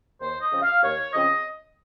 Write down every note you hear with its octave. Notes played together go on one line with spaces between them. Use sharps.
D#2 C5
D#5
C#3 F3 C4
F5
D#2 C#5
C#3 F3 C4 D#5